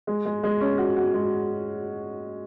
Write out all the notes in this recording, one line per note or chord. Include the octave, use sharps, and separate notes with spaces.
G#3
G#3
G#3
C#4
F#4
F#4
G#3